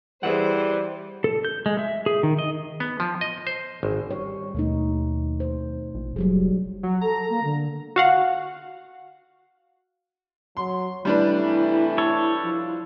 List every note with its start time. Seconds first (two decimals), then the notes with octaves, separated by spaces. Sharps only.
0.23 E3 G3 G#4 C5 E5 F#5
1.24 A4
1.45 G6
1.66 G#3
1.79 E5
2.06 G#4
2.23 D#3
2.39 D#5
2.80 B3
3.00 F3
3.21 D#5
3.47 C5
3.83 G#1
4.11 G3 C#5
4.55 D#2 B2 A3 D#4
5.40 C5
5.94 A#1
6.16 F#1 F#3 G3 G#4
6.83 F#3
7.01 A4 A#5
7.29 A#3
7.43 D3
7.96 F#4 F5 F#5
10.57 F#3 C6
11.05 C3 E3 G3 A3 D4 E4 B4
11.98 A4 C#5
12.43 F3